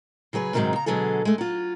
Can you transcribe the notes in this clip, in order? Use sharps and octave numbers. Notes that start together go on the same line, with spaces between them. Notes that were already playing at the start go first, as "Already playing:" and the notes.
C#3 F#3 G#4 B4
G#2 C3 D#3 F3 F#3 G#3
C#3 A#5
B2 D3 F#3 G#3 G#4 A4
G#3 A3
F#3 F4